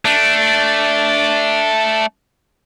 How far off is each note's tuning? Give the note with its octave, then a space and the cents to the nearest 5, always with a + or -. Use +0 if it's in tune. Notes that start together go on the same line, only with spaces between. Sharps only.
A3 +0 D4 -5